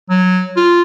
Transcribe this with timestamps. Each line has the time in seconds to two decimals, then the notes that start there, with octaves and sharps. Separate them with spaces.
0.10 F#3
0.57 F4